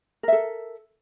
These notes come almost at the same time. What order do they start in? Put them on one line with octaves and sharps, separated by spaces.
A#4 E5 A4